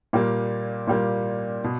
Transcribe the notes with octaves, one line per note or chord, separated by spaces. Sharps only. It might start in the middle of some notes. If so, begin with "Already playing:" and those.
A#2 G3 A#3
A#2 G3 A#3
B2